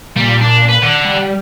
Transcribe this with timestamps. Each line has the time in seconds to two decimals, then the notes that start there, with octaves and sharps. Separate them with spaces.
0.16 A#2 G3
0.41 D4
0.68 B4
0.82 D5 F#5
1.05 G3